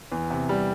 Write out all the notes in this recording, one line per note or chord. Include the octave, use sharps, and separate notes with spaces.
E2
C3
G3